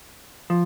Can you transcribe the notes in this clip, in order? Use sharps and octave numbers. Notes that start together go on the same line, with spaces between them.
F3